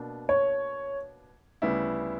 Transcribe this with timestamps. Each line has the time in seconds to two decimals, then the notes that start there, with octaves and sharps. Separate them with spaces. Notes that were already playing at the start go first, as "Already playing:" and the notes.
Already playing: B2 A#3 D4
0.29 C#5
1.62 D2 C#3 G3 B3 E4